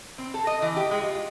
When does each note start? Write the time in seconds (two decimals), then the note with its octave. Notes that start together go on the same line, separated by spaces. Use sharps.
0.18 C4
0.34 A4
0.47 D#5
0.62 E3
0.76 G4
0.91 G#3
1.03 F4